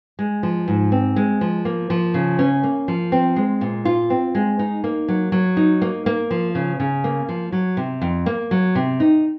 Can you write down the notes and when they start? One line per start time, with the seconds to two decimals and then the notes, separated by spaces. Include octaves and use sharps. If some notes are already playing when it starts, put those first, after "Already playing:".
0.19 G#3
0.43 F3
0.68 G#2
0.92 C4
1.16 G#3
1.41 F3
1.65 A#3
1.90 F3
2.14 C#3
2.39 C#4
2.63 A#3
2.88 F3
3.12 C4
3.36 G#3
3.61 A#2
3.85 F4
4.10 C4
4.35 G#3
4.59 D#4
4.84 A#3
5.08 F#3
5.32 F#3
5.57 D#4
5.82 A#3
6.06 A#3
6.31 F3
6.55 C#3
6.80 C#3
7.04 A#3
7.29 F3
7.52 F#3
7.77 C3
8.02 F2
8.26 A#3
8.51 F#3
8.75 C3
9.00 D#4